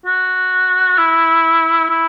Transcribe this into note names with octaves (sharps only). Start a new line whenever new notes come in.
F#4
E4
E4